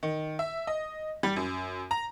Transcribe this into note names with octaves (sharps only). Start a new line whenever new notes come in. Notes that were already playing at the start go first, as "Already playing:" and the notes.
D#3
E5
D#5
G3
F#2
A#5